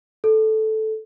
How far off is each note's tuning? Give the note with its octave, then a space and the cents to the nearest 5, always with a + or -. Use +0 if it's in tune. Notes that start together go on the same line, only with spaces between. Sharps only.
A4 -10